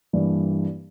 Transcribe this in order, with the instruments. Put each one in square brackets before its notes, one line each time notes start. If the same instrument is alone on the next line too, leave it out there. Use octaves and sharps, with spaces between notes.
[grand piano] G2 E3 A#3 D4